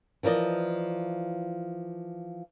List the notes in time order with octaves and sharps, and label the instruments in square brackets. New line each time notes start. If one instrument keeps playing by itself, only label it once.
[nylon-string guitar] E3 F3 A#4 D5 D#5